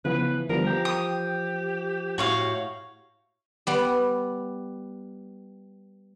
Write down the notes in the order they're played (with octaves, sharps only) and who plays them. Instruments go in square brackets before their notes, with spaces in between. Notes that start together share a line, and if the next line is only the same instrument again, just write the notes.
[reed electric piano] C#3 F3 B3 [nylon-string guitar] E3 [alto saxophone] B4
[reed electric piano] D3 G3 B3 [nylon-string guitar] F3 [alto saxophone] A#4
[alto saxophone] G4 [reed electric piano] G5 A#5
[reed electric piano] G5 [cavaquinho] D#6
[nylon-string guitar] A2 [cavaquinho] F#4 C#5 F5
[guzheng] G3 B3